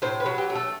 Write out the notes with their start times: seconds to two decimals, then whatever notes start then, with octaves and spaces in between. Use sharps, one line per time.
0.02 A2 C5
0.20 B4
0.26 F#3
0.38 G4
0.50 A3
0.55 A4